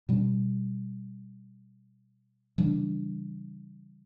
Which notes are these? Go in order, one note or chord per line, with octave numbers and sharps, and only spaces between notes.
B2 G3 C#4
C#3 E3 G3 D4